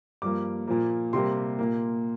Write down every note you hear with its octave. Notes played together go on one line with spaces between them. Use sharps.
G2 F3 A#3 D6
A#2 F3 A#3
C3 G3 A#3 C6
A#2 A#3